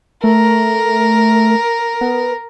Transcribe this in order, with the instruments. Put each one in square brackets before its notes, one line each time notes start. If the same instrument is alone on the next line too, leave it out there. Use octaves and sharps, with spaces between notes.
[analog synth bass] A3 [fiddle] A#4
[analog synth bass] B3